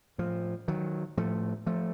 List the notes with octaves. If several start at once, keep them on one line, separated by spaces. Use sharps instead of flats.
A2 F3
D#3 F#3
A2 F3 A3
F3 A3